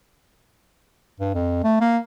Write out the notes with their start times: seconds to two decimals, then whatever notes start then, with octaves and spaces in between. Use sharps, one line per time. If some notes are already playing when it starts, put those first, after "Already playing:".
1.20 G2
1.34 F2
1.64 A3
1.81 A#3